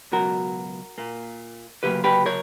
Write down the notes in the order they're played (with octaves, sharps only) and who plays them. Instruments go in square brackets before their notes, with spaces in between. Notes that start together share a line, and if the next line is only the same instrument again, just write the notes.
[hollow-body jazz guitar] C#2 B2 F#3 F#4 A#4
A#2 A#3
D2 C#3 F#3 A#3 G4 B4
G4 B4
A#4 C#5